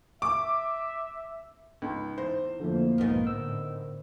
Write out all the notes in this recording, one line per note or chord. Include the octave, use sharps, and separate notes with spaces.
E5 D6
C#2 D#4
E2 C5
F2 D3 F3 A3 A#3
B1 G#2 D#3 B3
A2 D3 E6